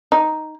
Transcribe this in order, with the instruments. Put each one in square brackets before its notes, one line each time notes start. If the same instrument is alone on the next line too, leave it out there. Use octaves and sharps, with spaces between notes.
[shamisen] D#4